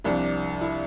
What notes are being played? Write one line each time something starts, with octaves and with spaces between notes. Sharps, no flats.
C2 C3 F3 D4
E4